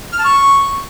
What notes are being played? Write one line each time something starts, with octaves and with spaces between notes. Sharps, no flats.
F6
A5
C#6